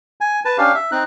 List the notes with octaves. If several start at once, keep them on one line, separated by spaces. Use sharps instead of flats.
G#5
B4 A5
C#4 D4 G4 F5
E5
C4 D#4 F#6